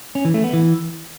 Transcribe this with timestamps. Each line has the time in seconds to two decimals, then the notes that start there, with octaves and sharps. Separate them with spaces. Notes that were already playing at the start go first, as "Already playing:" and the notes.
0.15 C#4
0.25 E3
0.34 A3
0.44 B3
0.53 E3